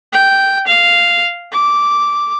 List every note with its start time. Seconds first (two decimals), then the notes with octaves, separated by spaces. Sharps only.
0.13 G5
0.67 F5
1.52 D6